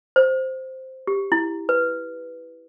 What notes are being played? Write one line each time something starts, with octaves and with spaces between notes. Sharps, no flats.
C5
G4
E4
B4